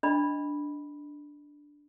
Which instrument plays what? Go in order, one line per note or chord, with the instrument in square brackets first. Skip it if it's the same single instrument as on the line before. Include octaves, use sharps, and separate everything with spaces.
[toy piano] D4 D#5 B5